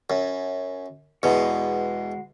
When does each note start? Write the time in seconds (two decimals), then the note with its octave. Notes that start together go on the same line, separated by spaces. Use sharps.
0.10 F#2
1.23 E2 B2 G#3 F#4